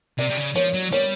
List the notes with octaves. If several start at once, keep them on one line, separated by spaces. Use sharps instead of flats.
C3 D5
C3
C#3
F3 C#5
F#3
G3 C#5